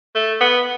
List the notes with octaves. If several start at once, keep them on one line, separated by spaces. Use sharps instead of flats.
A3
B3